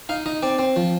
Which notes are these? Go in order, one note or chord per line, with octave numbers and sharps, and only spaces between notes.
D#4 F5
D#4 D#5
C4 D5
C4
F3